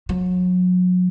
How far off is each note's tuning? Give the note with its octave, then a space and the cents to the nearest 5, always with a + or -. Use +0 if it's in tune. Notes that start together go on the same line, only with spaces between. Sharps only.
F#3 -30